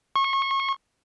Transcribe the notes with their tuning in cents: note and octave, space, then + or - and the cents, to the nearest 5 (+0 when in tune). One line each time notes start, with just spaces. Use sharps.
C#6 -30